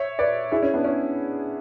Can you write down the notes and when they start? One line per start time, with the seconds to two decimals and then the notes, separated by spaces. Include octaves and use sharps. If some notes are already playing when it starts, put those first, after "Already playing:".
Already playing: C#5 E5
0.19 B4 D5
0.52 E4 G#4
0.62 C#4
0.74 B3 D4
0.85 C#4